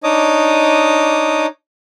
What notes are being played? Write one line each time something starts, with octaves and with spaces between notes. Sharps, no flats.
D4 D#4 C#5 D#5 D6 D#6